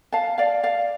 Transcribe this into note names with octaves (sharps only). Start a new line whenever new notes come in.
F5 A5
D5 F5
D5 F5